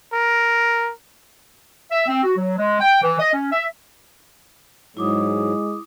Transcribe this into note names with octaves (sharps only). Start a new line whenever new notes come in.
A#4
E5
C4
F#4
F#3
G#3
G5
E3
D#5
C#4
E5
G#2 F#3 G#3 E4 D6 D#6